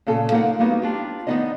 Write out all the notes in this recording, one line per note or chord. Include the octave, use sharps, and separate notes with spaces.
A#2 C#3 A4 G#5
A#3 D#4 F4 A#4 C#5 F#5
G3 A#3 B3 D#4 F#4
D4 F4 G4
D#3 E3 B3 D#4 D5 D#5